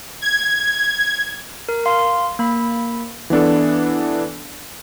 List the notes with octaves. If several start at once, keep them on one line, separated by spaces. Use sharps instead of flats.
G#6
A#4
F5 C6
A#3 B5
E3 B3 D4 A4